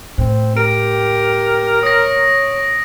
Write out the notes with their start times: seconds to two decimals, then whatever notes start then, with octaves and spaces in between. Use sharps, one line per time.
0.18 A2 A3 C4
0.57 G4 A#4 D7
1.83 C#5 D#6 A#6